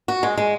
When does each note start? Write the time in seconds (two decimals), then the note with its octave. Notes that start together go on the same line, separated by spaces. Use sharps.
0.08 F#4
0.23 G#3
0.37 G#3